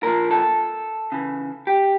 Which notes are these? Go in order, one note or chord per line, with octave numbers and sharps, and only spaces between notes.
A#2 F3 A#4
A4
C#3 E3
G4